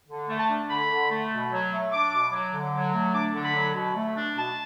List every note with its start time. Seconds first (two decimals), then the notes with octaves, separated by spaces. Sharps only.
0.08 D3
0.29 A3
0.39 A5
0.49 D4
0.70 D3 B5
0.90 D3
1.10 A3
1.31 B2
1.51 F#3
1.72 A3
1.92 D4 D6
2.12 B2
2.32 F#3
2.53 D3
2.73 F#3
2.93 A3
3.14 D4 D6
3.34 D3
3.44 B5
3.55 F#3
3.75 B2
3.96 A3
4.16 D4
4.36 B2 A5